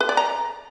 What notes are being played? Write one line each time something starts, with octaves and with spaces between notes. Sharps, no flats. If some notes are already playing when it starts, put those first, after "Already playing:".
B4
D5
A#5